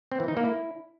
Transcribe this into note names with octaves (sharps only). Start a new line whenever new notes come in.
C4
E3
D#4
A#3
E4